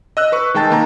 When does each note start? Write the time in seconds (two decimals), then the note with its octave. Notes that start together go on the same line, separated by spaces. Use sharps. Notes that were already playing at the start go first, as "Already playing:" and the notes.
0.17 D#5 E6 F#6
0.32 B4 C#6
0.54 D#3 G#3 G5 A5 A6
0.70 D#3 A#3 A#5